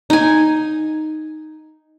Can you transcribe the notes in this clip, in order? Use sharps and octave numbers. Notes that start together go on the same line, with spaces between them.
D#4 G#5